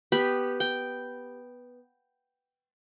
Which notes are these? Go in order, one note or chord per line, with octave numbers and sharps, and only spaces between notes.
B3 G4 B5
G5